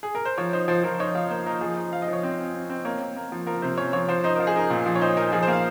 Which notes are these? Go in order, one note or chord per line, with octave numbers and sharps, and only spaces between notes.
G#4
A#4
C5
F3 C#5
D#4 C5
F3 C5
F3 A#4
D#4 C#5
F3 F5
A#3 C5
D#4 A#4
F3 G#4
D#4
F3 F5
D#5
F3 C#5
C4
C4
C4
C4
A#3 C#5
A#3
A#3
F3
F3 A#4
C3 C5
C#4 C#5
F3 C#5
F3 C5
D#4 C5
F3 A#4
G#4
D#4 A#4
A#2
F3
C#5
D#4 C5
D#4 A#4
F3 G#4
C5
A#3
F5